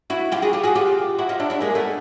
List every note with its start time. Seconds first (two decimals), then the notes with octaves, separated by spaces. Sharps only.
0.10 E4 F#4
0.32 F4 G4
0.42 F#4 G#4
0.53 F4 G4
0.64 F#4 G#4
0.75 F4 G4
1.18 E4 F#4
1.29 D#4 F4
1.40 D4 E4
1.50 D4 E4
1.61 G#3 A#3
1.75 A3 B3